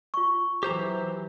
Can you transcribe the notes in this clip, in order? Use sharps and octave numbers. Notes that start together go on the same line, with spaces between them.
F4 C#6
E3 F#3 G4 C5 A#5